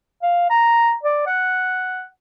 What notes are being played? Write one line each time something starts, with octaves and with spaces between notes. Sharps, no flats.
F5
A#5
D5
F#5